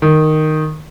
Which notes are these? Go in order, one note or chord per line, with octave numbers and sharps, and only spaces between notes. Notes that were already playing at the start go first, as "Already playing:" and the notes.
D#3